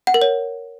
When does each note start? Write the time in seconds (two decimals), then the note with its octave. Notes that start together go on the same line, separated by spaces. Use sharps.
0.07 F#5
0.14 A#4
0.22 C#5